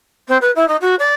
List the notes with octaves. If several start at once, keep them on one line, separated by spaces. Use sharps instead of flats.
C4
B4
E4
D#4
F#4
D5